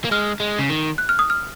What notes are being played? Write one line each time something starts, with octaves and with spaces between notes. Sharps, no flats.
A#3
G#3 F6
G#3
C#3
D#3
F#6
F6
D#6
F6